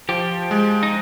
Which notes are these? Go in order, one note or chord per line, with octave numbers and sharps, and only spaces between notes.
F3 G4
G#3
D#4